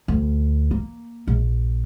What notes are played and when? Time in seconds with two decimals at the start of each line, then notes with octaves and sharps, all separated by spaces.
0.08 D2
0.71 A#3
1.27 A#1